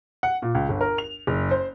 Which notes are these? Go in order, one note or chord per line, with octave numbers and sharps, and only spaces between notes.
F#5
A#2
C#2
G1
A#4
F7
F#1
C5